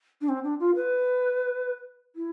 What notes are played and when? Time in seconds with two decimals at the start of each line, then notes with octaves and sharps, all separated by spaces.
0.21 D4
0.28 C4
0.43 D4
0.59 F4
0.75 B4
2.15 E4